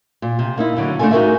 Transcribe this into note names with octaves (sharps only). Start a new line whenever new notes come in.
A#2
C3
A#3 D#4 E4
A2 D3 F#3
A3 D4 D#4 F4 A4 G#5
D#4 F#4 G#4 A#4 E5